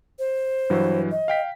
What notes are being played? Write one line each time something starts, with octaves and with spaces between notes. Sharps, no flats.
C5
G2 E3 F#3
D#5
F5 G5 B6